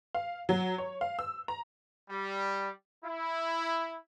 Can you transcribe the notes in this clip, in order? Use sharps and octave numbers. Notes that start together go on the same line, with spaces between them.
F5
F#3
C#5
F5
E6
A#5
G3
E4